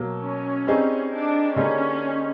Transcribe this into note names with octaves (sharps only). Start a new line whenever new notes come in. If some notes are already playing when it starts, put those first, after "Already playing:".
Already playing: B2 F#3 A#3
C#4
G3 C4 D#4 G#4
D4
D3 G3 A#3 C#4 D#4 G#4